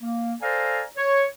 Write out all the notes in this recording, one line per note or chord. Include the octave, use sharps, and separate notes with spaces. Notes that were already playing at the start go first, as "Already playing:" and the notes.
A#3
A4 C5 D5 F5 G#5 A#5
C#5